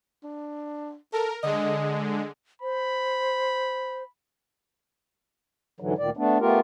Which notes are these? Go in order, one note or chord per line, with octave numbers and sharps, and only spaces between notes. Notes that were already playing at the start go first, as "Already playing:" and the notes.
D4
A4 A#4
D3 G#3 D#5
C5 B5
G#2 D3 E3 F#3
D2 A#2 D#3 D5
A3 B3 D4
A3 B3 F4 G4 A#4